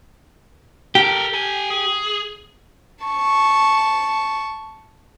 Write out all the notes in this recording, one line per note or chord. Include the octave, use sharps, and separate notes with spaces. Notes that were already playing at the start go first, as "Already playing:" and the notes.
G4 A4 A#4
A4 G#5
G#4
A5 C#6